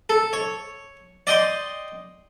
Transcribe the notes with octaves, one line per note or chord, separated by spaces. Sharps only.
A4
C#5
D5 D#5 G5 C6